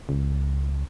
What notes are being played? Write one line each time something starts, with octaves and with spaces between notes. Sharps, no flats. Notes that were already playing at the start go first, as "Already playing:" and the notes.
C#2